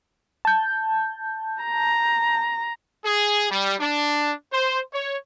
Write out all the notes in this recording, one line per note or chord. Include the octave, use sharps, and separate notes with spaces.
A5 G6
A#5
G#4
G3
D4
C5
C#5